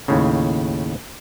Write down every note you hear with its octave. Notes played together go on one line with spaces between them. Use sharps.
D#2 A2 C#3